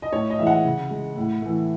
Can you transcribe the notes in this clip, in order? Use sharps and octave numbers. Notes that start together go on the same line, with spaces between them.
D#5
A2 C#5
D#5
E3 G#3 E5 F#5
C#3
G#3
A2
E3 A3